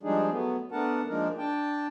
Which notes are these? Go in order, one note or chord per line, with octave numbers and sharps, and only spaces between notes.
F3 G3 G#3 D4 D#4 G#4
F#3 A3 B3
A3 B3 D4 A#4 F#5 A5
F3 G#3 A#3 D4 D#4 A#4
D4 G5 A5